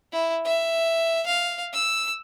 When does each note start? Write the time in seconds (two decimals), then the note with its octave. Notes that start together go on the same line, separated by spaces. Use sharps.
0.12 E4
0.45 E5
1.26 F5
1.73 E6